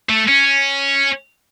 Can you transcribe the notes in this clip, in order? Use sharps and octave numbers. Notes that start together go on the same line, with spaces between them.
A3
C#4